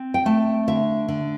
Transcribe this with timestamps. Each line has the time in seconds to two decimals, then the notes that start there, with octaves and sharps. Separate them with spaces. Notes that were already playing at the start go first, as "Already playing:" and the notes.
Already playing: C4
0.14 G5
0.26 A3 A5
0.68 D3 E5
1.08 D3